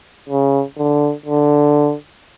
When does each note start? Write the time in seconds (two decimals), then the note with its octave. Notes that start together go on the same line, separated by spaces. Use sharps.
0.29 C#3
0.78 D3
1.26 D3